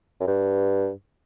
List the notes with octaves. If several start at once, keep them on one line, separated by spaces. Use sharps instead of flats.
F#2
G2